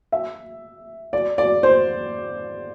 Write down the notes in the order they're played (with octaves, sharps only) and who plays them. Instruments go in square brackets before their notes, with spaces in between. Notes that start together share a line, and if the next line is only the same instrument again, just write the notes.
[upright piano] E5
D5
D5
C5